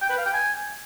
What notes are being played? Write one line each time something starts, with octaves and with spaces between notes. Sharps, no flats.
G5
B4
F5
G5
G#5